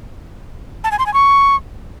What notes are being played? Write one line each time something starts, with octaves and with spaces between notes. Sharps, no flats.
A5
G#5
C6
G#5
C#6